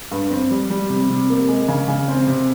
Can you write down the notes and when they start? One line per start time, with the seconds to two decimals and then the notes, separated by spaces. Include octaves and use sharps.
0.11 G2
0.30 C4
0.51 G3
0.70 G3
0.89 C3
1.10 C3
1.30 A#3
1.49 G#3
1.68 C#3
1.88 C#3
2.08 C4
2.27 C3